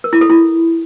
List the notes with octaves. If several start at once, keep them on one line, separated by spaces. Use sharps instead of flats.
A#4
E4
A4
E4